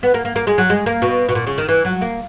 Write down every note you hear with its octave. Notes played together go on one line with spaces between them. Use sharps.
B3
A#3
A#3
A#3
G#3
F#3
G#3
A#3
B2
B2
A#2
C#3
D#3
E3
F#3
A#3